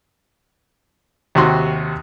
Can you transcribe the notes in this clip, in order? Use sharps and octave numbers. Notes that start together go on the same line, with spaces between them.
D#2 C3 F#4 C6